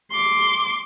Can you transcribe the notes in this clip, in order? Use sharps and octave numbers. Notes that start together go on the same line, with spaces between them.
C6 D6